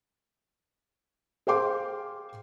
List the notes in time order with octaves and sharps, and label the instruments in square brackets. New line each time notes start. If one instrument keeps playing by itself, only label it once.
[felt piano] G#4 C5 F5 G5 C6 D6